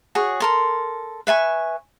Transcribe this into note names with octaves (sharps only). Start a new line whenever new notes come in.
F#4 G#4 C#5
A4 A#4 C6
B4 E5 G#5 C#6